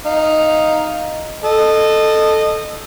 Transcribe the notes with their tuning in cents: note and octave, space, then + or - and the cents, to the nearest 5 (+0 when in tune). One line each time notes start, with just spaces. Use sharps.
D#4 +0 F5 +0
A4 +0 D#5 -20